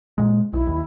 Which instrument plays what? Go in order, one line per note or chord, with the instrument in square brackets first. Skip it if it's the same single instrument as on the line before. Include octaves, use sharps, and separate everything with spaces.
[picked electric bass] A#2 G#3
[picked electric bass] B1 [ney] E4
[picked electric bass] D#2